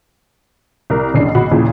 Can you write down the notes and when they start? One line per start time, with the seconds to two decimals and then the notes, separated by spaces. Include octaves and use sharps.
0.90 C2 A#4
1.14 F#1 B1 E2 C#4 D4 C7
1.35 F#1 B1 F#4 B5
1.51 D#2 A#2 C#3 E3 F3